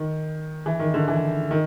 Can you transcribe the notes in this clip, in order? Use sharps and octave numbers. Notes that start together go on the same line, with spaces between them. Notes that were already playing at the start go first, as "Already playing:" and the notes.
Already playing: D#3
E3
D#3
D3
E3
D#3